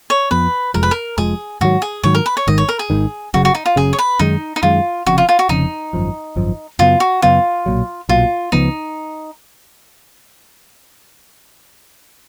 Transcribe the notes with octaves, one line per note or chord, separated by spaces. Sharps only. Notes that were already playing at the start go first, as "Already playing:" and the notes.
C#5
F2 F3 B3 B4
F1 F2 F3 G#3 A#4
B4
A#4
F1 F2 F3 G#3 G#4
G#2 D#3 F#3 F#4
G#4
G#2 D#3 F#3 C#5
A#4
B4
C#5
G#1 G#2 D#3 D#5
C#5
A#4
G#4
G#1 G#2 D#3
F#1 F#2 C#3 F#4
F#4
D#4
F4
F#1 F#2 C#3 G#4
C#5
B4
F#2 D#3 G#3 D#4
D#4
F#2 D#3 G#3 F4
F1 F2 C#3 F#4
F4
F4
F#4
F1 F2 C#3 D#4
G#1 F#2 F3
G#1 F#2 F3
F#2 C#3 F#3 B3 F4
F#4
F#2 C#3 F#3 B3 F4
B1 A#2 F#3
B1 A#2 F#3 F4
C#2 C#3 F3 B3 D#4